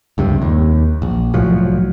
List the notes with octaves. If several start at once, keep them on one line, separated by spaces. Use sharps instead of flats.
C#2 G2 C3
D#2
A#1
C2 A2 F3 F#3